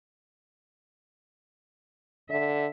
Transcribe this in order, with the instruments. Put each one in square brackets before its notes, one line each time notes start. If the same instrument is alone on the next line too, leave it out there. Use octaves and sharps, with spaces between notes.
[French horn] D3 [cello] E5